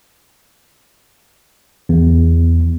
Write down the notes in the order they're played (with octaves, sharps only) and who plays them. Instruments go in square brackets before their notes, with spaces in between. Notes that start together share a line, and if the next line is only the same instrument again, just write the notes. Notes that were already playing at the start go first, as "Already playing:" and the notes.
[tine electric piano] E2